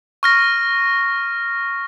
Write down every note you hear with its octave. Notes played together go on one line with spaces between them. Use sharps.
C#6 F6 A#6